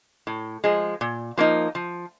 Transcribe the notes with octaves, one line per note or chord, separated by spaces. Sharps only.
A2
F3 G#3
A#2
F3 A#3 D#4
F3